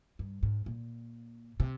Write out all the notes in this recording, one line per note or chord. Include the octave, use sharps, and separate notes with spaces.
G2
G#2
A#2
C3